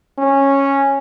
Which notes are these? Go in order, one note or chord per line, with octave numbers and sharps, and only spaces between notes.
C#4